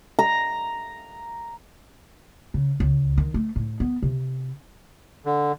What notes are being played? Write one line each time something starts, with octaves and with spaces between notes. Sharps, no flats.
A#5
C#3
C#2
D#3
A3
A2
B3
C3
D3